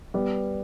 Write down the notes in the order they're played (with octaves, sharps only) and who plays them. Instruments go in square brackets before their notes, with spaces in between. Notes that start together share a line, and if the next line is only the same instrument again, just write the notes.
[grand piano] G3 B3